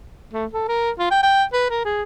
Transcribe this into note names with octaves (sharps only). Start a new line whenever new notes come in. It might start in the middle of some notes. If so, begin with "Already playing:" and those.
A3
A4
A#4
F4
G5
G5
B4
A#4
G#4